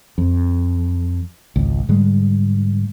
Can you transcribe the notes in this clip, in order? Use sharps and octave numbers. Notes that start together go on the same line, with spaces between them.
F2
G#1 C#2
G#2 D3 G3 G#3